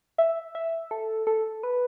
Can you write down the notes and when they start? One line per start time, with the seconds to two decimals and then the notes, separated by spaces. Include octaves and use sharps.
0.18 E5
0.55 E5
0.91 A4
1.27 A4
1.63 B4